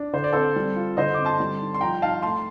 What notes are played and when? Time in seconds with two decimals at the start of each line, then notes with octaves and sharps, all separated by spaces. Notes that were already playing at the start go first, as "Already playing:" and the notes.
Already playing: D4
0.13 D3 C5
0.24 D5
0.33 C4 A4 C5
0.56 G3
0.76 F4
0.97 D3 C5 D#5
1.14 C4 D6
1.25 A5 C6
1.40 G3
1.60 D#4
1.74 C6
1.81 F3 G5 A#5
2.02 D#4 F5 A5
2.22 A3 A5 C6